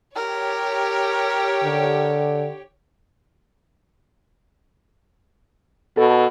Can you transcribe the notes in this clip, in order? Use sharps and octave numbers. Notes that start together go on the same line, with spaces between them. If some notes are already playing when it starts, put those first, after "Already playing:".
G4 A#4 C#5
D3
B2 A4